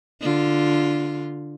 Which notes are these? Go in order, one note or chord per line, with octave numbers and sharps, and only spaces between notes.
D3 F4